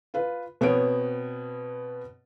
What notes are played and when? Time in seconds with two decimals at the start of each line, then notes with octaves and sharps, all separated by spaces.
0.14 F4 B4
0.61 B2 B3 C4 C#5 D7